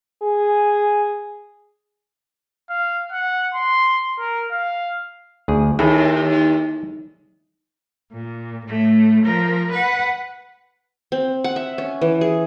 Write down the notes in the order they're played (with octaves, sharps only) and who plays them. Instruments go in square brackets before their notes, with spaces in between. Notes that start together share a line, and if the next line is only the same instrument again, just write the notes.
[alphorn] G#4
[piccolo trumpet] F5
F#5
C6
A#4
F5
[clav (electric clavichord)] D2 G#4
[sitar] D#2 [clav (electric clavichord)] E4 G#4 A4
[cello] A#2
A2 A3
F3 A#4
B4 F#5
[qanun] C4
F#5
E5
C#4
E3
G#4